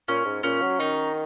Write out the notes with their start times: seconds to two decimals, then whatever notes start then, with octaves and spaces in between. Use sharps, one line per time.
0.08 A#2 C#4
0.25 G#2
0.43 A#2 C#4
0.62 F#3
0.79 D#3 D#4